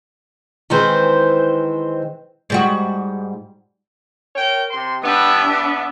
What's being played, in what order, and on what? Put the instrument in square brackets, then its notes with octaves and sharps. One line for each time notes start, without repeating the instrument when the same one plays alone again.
[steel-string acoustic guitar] D#3 E3 G#3 C4 B4 C5
[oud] G#2 G3 F#4
[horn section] A#4 C#5 G5
C3 C6
[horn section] G3 B3 [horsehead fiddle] D4 E5
[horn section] B3